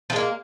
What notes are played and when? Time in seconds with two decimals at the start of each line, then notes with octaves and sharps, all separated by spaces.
0.10 F3
0.13 G#3
0.16 A#3